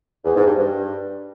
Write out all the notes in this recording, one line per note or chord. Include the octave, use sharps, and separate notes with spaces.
E2
G#2
G2
G2